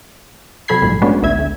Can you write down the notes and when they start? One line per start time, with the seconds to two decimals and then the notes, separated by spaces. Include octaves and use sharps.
0.68 C3 F#3 A4 B5 G#6 C7
0.82 A#1 G#2
1.02 G#3 A3 B3 C#4 D4 F#4
1.22 A1 D2 E5 G#6
1.39 D2